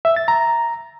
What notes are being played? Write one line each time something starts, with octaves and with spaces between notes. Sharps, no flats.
E5
A6
A#5